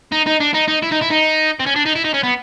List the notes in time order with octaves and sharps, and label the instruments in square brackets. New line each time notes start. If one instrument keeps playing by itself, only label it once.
[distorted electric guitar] D#4
D#4
D4
D#4
D#4
E4
D#4
E4
D#4
C4
C#4
D4
D#4
E4
D#4
C#4
B3